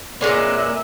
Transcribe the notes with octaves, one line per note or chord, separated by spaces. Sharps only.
A#2 G#3 A#3 B3 B4 C#5 D5 E5